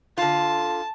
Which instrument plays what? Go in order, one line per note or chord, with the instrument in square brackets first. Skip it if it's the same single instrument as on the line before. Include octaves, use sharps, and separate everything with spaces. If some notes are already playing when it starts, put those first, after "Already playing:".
[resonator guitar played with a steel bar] D3 F4 [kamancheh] A5